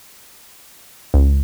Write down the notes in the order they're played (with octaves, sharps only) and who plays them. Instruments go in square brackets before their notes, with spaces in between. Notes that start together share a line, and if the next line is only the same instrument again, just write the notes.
[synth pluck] C#2